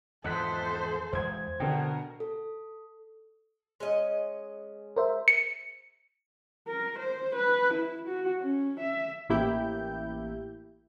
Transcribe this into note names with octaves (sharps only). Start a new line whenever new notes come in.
E2 G#2 F3 A4 C5 D#5 F#6 B6
E2 G#3 C5 G#6
B2 D3 A#4 G5
A4
G#3 C#4 D#5
A#4 C5 E5
C#7
A#4
C5
B4
E4
F#4
C#4
E5
A1 A#3 E4 G4 G6